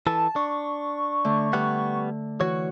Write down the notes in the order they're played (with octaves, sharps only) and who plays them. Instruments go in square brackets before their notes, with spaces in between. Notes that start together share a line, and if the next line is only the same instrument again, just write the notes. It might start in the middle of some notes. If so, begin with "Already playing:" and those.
[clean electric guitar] E3 A4 [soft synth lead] A5
[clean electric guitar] D4 [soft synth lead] C#6
[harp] D3 A3
[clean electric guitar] G3 B3 F#5
[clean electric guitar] E3 C#5 [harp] F#4